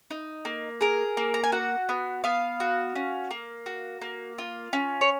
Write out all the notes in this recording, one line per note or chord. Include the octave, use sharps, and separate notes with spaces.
D#4
A#3
G#4 A#4
A#3
A#5
G#5
F#4 F#5
B3
B3 F5
F#4
C#4
A#3
F#4
A#3
F4
C#4
C#5